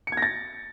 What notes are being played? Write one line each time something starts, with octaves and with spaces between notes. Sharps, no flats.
C#7
G#6
A#6
A6